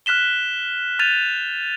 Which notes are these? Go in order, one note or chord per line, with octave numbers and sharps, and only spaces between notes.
F6 F#6 B6 E7 G7
F6 G6 A6 D#7 F7